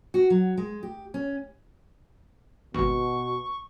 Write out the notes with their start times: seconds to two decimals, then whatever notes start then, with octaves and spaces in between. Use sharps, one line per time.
0.14 F#4
0.30 F#3
0.57 G#3
0.83 G4
1.14 C#4
2.74 G#1 D#2 B2 C#6